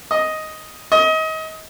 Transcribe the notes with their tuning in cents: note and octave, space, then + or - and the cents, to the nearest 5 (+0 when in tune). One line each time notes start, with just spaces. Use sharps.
D#5 +5
D#5 +30